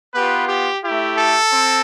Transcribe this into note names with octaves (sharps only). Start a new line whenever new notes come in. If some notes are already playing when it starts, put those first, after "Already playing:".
B3 F4 G4 B4
G4
A3 E4 G4
A4
C4